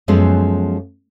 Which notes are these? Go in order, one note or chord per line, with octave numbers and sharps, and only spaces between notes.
F#2 F3 G#3 B3 C#4 A4